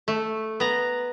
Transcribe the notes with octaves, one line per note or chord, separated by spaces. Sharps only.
A3
B3 A#5